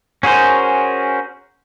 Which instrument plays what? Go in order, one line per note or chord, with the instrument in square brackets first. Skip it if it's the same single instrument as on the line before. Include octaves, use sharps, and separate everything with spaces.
[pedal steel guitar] C#4 F#4 G#4 A#4 C5